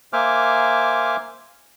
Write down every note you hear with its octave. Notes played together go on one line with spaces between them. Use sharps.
A#3 C5 E5 G#5 D6 F6